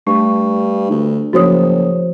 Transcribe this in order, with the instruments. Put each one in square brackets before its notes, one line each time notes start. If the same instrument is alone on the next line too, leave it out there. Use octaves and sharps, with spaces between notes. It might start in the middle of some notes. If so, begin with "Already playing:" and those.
[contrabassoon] G2 [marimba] A3 [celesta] C#6
[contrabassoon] D2
[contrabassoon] F#1 [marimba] F3 D#6 [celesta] F#4 C5 C#5